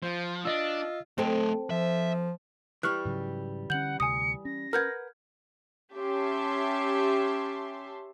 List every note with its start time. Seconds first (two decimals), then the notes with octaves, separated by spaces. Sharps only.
0.03 F3 C5
0.45 D4 F4 D#5 E6
1.18 A3 C4 A4 D#5
1.70 F3 E5
2.83 E3 G3 C#6 F6 F#6
3.05 G#2 C#3 F#3
3.70 D3 C#4 F#5 G6 F#7
4.00 D2 C3 G#5 D#6 C#7
4.45 C#4 A#6
4.73 A#4 B4 F#5 F6 G6 G#6
5.95 C#4 G4 E5 A5 C6